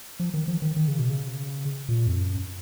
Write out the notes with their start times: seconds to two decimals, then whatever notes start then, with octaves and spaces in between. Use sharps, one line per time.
0.20 F3
0.34 D#3
0.48 F3
0.62 D#3
0.76 D#3
0.88 C#3
0.99 B2
1.10 C#3
1.89 A#2
2.07 F2
2.17 F#2